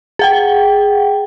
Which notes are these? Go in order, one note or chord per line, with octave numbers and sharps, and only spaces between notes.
G#4 F#5 G5